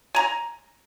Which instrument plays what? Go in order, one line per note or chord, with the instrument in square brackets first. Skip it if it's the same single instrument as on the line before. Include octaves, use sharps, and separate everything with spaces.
[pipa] G#5 A#5